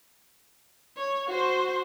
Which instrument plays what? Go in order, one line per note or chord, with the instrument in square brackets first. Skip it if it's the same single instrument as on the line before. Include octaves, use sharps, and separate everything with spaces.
[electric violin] C#5
F#4 C5